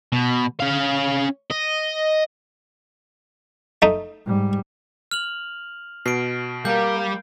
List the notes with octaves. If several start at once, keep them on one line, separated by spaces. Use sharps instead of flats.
B2
C#4 F5
D#5
A3 D#4
G#2 G3
F6 F7 F#7
B2 C7 D7
G3 A#3 A#4 G6